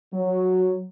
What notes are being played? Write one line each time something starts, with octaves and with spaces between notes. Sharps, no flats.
F#3